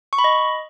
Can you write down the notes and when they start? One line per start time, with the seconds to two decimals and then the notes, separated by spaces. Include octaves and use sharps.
0.13 C#6
0.18 B5
0.24 D#5